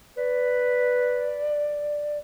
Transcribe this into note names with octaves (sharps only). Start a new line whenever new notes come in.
B4 D5